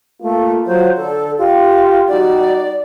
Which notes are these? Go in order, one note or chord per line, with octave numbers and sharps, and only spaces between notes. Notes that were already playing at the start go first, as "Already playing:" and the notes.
A3 A#3 F4
F#3 F4 C5
D3 A4
F4 G4
G3 D#4 F#4 D5